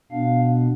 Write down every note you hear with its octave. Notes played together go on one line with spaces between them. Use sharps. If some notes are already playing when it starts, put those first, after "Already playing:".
B2 B3 D4 F5